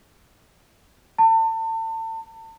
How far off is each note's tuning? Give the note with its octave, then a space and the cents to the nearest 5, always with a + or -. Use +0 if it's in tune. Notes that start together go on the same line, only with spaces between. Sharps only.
A5 +35